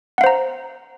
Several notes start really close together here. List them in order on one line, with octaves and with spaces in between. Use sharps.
F#5 F5 C5 A#5